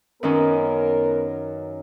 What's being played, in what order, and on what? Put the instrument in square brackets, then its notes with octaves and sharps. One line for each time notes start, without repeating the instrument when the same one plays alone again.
[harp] F#2 D#3 C#4 [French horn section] B3 A#4